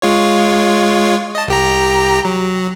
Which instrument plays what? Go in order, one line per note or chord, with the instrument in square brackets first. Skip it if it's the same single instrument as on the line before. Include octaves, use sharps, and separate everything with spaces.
[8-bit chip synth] G#3 F4 C#5
D#5 A5
C2 G4 A#5
F#3